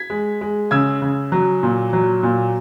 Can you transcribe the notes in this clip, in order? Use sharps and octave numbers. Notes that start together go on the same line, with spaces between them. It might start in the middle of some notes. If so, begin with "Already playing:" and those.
Already playing: G#6 B6
G#3
G#3
C#3 E6 G#6
C#3
F#3
A#2
F#3
A#2